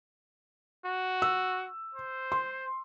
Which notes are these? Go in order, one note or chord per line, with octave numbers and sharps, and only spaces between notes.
F#4
E6
C5
C6